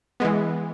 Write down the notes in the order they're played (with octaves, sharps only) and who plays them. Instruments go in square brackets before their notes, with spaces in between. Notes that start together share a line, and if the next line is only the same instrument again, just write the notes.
[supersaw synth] E3 G#3 B3